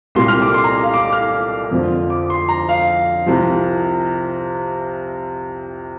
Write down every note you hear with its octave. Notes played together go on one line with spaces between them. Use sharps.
C2 A#2 G3 C6
F6
D6
C6
A#5
F5
D6
F6
F2 D3 F3
D6
C6
A#5
F5
C2 C3 F3